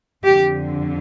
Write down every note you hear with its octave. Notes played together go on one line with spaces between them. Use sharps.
F2 D3 G4